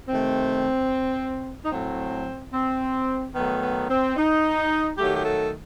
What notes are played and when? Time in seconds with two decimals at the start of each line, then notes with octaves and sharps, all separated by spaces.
0.08 C3 D#3 A3 C4
1.65 D#4
1.72 A2 F#3 A3 C4
2.53 C4
3.35 D#3 F#3 A3 B3
3.62 B3
3.89 C4
4.17 D#4
4.98 D#3 F#3 A3 G4
5.15 G4
5.25 A4